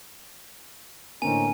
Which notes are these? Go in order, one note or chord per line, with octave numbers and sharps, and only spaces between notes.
A2 D3 A#3 C4 C#4 D#4 G#5